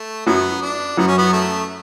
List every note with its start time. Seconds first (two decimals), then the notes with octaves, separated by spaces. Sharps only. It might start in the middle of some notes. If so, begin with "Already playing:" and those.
Already playing: A3
0.26 F#2 F#3 B3
0.62 D4
0.97 F#2 F#3 B3
1.08 C#4
1.18 B3
1.33 A3